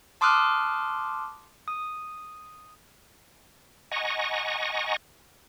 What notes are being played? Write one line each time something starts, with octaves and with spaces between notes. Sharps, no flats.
A5 C6 D6 D#6 F6 F#6
D#6
D#5 F#5 G#5 A#5 C#6